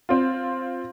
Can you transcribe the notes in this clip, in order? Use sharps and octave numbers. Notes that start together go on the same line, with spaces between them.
C4 F4